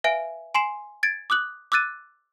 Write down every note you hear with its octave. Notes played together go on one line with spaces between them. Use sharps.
B4 E5 F5 G#5 D7
G#5 C6 C7 E7
G#6 A6 D7
D6 D#6 F#6 F#7
D6 E6 F#6 A6 D#7